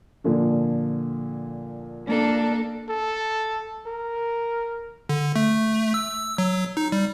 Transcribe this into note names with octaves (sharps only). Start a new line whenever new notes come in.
A#2 D3 F3
A#3 D4 A4
A4
A#4
D3
A3
E6
F#3
D#4
G3